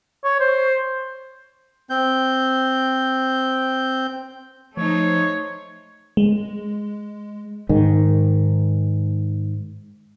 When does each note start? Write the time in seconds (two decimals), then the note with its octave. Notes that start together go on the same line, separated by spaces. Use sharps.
0.24 C#5
0.40 C5
1.90 C4 G6
4.77 F3 A3 D#4 C5 C#5
6.17 G#3
7.69 G#2 D#3